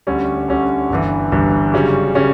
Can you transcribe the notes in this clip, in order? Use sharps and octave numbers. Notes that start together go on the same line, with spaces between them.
D2 D3 G3 C#4
D2 D3 G3 C#4
G1 G2 E3
G1 G2 E3
F#2 C#3 G3 C#4
C#3 G3 C#4